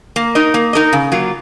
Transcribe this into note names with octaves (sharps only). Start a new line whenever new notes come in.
A#3
D#4 A#4 D#5
A#3
D#4 A#4 D#5
C#3
F#3 A#3 F4